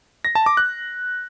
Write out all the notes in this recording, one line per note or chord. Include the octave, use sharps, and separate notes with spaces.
A#6
A5
D6
F#6